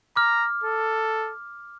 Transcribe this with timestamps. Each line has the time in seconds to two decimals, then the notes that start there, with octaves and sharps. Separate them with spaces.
0.16 A#5 D6 F6
0.64 A4